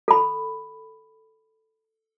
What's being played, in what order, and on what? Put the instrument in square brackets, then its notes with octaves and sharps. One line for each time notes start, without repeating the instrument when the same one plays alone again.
[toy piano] A4 B5